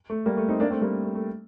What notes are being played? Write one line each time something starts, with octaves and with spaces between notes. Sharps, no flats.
A3
G3 A#3
A3
C4 D#4
A#3 D4
A3 C4
G3 A#3
A3
A3